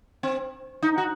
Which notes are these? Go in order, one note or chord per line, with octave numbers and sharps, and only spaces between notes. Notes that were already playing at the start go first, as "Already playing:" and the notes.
C4
D#4
F#4